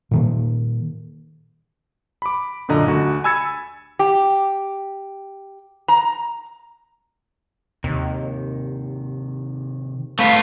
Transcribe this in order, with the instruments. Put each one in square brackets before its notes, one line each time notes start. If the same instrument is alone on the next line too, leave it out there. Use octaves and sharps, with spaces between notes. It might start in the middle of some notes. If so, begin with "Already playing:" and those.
[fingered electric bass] A#2 D#3 A#3
[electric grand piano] B5 D6
F#2 A#2 D3 D#5 A#5
D2 D3 F#4
G#5 B5 E6 G#6 A6 C#7
[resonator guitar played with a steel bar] G4
A#5
[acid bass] D#2 [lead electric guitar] C3 D#3
[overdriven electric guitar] A3 B4 [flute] F5